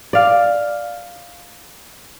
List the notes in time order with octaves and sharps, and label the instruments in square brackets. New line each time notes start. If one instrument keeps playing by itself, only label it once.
[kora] D5 F5